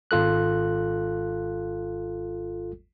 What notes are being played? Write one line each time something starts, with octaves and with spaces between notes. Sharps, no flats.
G#1 F4 A4 F#6